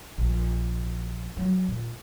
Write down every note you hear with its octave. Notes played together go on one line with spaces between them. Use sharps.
A#1
F#3
A#2